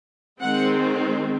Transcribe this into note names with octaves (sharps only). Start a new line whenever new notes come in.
D#3 G#3 C4 F#5